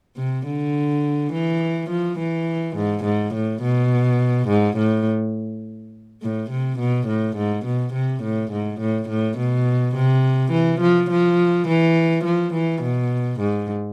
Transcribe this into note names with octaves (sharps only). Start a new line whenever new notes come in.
C3
D3
E3
F3
E3
G#2
G#2
A2
B2
G#2
A2
A2
C3
B2
A2
G#2
B2
C3
A2
G#2
A2
A2
B2
C3
E3
F3
F3
E3
F3
E3
B2
G#2